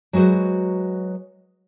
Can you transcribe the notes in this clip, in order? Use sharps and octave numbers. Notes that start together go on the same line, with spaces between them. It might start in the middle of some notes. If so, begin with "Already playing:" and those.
F#3 G#3 F#4 B4 C5